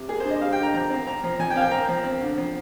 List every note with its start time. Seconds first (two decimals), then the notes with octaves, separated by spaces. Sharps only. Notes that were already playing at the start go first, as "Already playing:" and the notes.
Already playing: C3
0.09 A#3 G#4
0.20 D4 C5
0.30 D#5
0.41 G3 F5
0.53 G5
0.58 D3 A#5
0.74 F3 A#5
0.90 C4
1.07 C4 A#5
1.24 F3
1.39 F3 G#5
1.50 G5
1.56 C4 F5
1.61 G5
1.71 C4 A#5
1.89 F3
2.04 C4
2.21 D3
2.38 F3